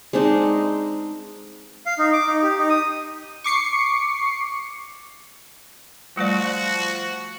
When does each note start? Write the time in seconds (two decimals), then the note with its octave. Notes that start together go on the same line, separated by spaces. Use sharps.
0.13 G#3 C4 D4 D#4
1.86 F5
1.98 D#4
2.13 D6
2.26 D#4
2.42 G4
2.58 D#4
2.70 D#6
3.44 C#6 D6 C7 C#7
6.17 F3 G3 A3 F#4 D5